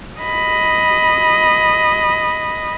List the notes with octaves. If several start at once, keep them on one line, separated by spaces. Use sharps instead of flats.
D#5 B5